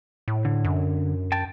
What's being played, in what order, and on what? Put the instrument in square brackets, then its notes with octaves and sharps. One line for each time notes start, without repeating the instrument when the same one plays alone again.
[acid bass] A2
[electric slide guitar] D3
[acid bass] F#2
[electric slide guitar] G5 A5